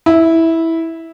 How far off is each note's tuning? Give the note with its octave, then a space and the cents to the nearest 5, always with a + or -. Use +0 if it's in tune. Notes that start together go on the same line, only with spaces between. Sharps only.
E4 -10